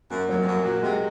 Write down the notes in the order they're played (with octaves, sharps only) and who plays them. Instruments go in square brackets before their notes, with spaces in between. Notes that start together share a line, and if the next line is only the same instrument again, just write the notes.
[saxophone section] F#2 [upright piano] A#3
[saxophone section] F2 [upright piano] F#3
[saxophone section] F2
[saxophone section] F#2 [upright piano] A#3
[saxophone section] A#2 [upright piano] F#4
[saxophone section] C3 [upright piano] G#3